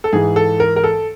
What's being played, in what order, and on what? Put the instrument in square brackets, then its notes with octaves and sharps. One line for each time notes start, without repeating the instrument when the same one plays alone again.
[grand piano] A4
G#2 E3 G#4
A4
A#4
A#4
A4